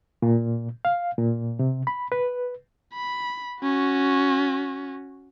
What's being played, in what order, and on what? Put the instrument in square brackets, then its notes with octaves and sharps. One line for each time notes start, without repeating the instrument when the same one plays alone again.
[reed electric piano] A#2
F5
A#2
C3
B5
B4
[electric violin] B5
C#4 F#4